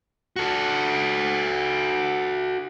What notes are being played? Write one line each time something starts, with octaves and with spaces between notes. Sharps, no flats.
F#4 A4